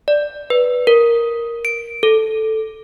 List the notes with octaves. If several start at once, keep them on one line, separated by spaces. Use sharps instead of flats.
D5
B4
A#4
D7
A4